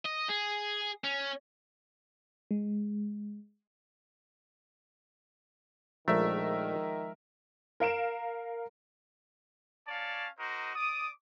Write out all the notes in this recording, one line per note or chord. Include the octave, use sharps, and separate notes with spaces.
D#5
G#4
C#4
G#3
A#1 D#3 F3 G#3 A3 A#4 E5
A#4 F5 D7 E7
C#4 C#5 D5 F5 A5
D#4 F#4 A#4 C5 D#5
D5 D6 D#6